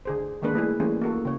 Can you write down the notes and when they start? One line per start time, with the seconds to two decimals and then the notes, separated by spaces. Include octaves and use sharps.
0.05 D3 G#4 C5
0.42 D#3 G#3 A#3 D4 B4
0.54 G3 A3 E4 G#4
0.80 E3 G3 A3 A#3 C#4 G#4
1.02 A#3 F#4 A4
1.25 C#3 C#5